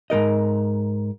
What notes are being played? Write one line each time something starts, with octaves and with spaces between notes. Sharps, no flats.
G#2 D#3 A#4 D#5